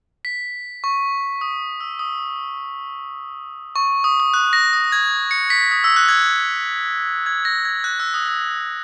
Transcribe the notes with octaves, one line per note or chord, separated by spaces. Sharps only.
B6
C#6
D#6
E6
D#6
C#6
D#6
D#6
F#6
A#6
D#6
G#6
C#7
B6
D#6
E6
F#6
G#6
G#6
A#6
G#6
F#6
E6
D#6
E6